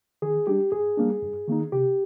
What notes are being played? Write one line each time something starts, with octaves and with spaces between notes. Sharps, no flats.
D#3 G#4
G3 D4 G4
G#2 G#4
G3 A#3 D4
G2
D#3 A#3 D#4
C3 G4